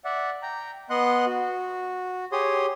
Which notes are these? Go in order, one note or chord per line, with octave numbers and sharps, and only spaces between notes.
D5 E5 F#5
G5 A#5
B3 D#5 F#5 C6 F#6
F#4
G4 G#4 C#5 C6 D#6